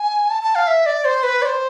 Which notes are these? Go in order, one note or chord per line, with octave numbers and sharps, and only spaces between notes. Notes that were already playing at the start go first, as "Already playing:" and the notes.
Already playing: G#5
A5
A5
F5
E5
D5
C5
B4
D5
C5